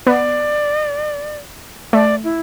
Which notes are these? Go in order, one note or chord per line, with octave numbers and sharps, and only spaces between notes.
B3 D5
A3 D5
E4